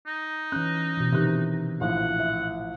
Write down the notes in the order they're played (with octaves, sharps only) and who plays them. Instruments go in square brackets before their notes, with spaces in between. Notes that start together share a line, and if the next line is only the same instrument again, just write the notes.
[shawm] D#4
[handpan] E3 C#4 [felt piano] F#6
[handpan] B2 E3
[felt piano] C3 D#3 F#6 [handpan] E3
[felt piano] A#1 A2 F3 [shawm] F#5
[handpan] E5